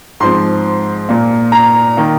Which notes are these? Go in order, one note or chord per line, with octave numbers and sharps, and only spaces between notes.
G#2 F3 C4 C6
A#2 A#3
A#5
D#3 A#3